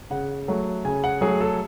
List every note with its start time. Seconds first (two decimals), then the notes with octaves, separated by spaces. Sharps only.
0.10 C#3 F#5
0.48 F#3 A3
0.85 C#3 G#5
1.04 F#5
1.21 F#3 A3 G#4
1.40 A4